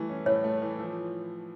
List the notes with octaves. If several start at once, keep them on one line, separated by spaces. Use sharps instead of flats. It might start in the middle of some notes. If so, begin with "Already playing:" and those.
Already playing: E3 G3 A3
C#4
A2 C#5
A3
E3
F3